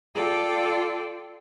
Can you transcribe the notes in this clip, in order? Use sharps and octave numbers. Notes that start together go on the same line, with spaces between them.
F4 A4 D5 G5